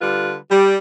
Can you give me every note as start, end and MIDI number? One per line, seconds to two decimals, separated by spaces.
0.01 0.35 50
0.01 0.35 55
0.01 0.35 65
0.01 0.35 71
0.51 0.76 55